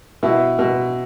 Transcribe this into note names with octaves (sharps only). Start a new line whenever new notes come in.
B2 E4
B2